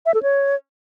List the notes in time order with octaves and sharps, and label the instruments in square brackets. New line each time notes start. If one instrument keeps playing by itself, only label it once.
[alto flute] E5
A4
C#5